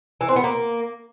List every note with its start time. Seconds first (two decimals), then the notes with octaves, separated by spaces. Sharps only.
0.21 E3
0.28 C4
0.36 B3
0.44 A#3